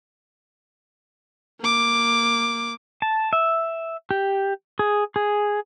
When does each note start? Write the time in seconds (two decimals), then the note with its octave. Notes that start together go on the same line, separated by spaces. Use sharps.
1.60 A#3 D6
3.02 A5
3.33 E5
4.11 G4
4.79 G#4
5.16 G#4